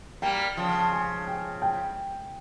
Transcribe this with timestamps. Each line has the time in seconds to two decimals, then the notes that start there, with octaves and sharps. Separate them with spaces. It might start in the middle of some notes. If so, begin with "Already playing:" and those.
0.22 G3 A#3 G5
0.57 C#3 F3
0.92 G#5
1.27 G5
1.62 G5